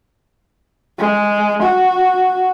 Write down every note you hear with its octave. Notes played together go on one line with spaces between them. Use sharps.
G#3
F#4